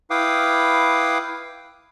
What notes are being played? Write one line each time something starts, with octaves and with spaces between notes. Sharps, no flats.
E4 B4 F5 G5 D6 D#6